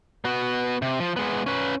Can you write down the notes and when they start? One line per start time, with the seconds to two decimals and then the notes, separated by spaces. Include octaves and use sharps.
0.25 B3 F#4
0.82 C3
1.00 F3
1.16 G#3 B3
1.46 C#4 B4